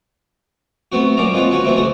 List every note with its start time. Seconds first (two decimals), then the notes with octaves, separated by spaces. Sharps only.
0.92 A3 B3 C4 F#4
1.17 F#2 A#2 C#4 D5 F5 A#5
1.33 G#3 C4 F4 B4 C#5
1.51 C#4 F#4 B4 C#5
1.65 B2 E3 F#3 A3 C4 E4
1.77 C#2 F#4 A4 D#6